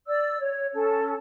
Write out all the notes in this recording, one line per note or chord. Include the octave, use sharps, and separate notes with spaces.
D5 E6
C#5
C#4 A4